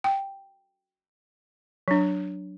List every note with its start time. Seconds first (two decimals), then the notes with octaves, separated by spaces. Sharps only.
0.04 G5
1.88 F#3 D4